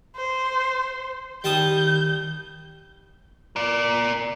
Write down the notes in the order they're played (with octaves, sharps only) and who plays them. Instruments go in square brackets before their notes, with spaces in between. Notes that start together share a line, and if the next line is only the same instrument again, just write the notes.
[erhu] C5
[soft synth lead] D#3 [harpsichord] G3 A5 D#6 [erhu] G6
[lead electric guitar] A#4 D5